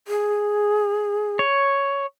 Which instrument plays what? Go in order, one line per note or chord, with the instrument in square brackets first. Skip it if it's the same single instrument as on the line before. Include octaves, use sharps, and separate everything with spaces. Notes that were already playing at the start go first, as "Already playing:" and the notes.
[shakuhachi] G#4
[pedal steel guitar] C#5